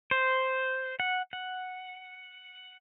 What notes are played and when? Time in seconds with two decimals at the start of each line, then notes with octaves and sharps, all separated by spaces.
0.11 C5
1.00 F#5
1.33 F#5